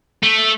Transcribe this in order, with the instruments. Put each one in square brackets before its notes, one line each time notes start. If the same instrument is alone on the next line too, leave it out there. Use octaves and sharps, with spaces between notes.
[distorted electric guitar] A3